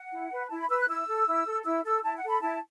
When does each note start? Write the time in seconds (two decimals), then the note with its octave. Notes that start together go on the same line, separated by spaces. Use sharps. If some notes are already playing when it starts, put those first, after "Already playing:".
Already playing: F#5
0.12 E4
0.31 B4
0.50 E4 A5
0.60 B5
0.69 B4 E6
0.79 F#6
0.88 E4 E6
1.08 A4
1.27 E4
1.46 A4
1.65 E4 E6
1.84 A4 E6
2.03 E4 A5
2.16 F#5
2.23 A4
2.29 B5
2.42 E4 A5